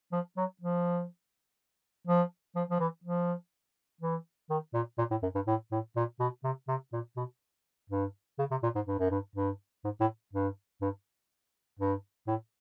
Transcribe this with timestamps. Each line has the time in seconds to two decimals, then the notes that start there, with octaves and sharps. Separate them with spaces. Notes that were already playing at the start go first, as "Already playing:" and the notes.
0.12 F3
0.37 F#3
0.61 F3
2.07 F3
2.56 F3
2.70 F3
2.79 E3
3.04 F3
4.01 E3
4.50 D#3
4.74 A#2
4.98 A#2
5.11 A2
5.23 F#2
5.35 G2
5.47 A2
5.72 A2
5.96 A#2
6.20 B2
6.44 C3
6.68 C3
6.93 A#2
7.17 B2
7.90 G2
8.39 C#3
8.51 C3
8.63 A#2
8.75 G#2
8.87 G2
8.99 F#2
9.10 G2
9.35 G2
9.84 G#2
10.00 A2
10.33 G2
10.81 G2
11.79 G2
12.27 A2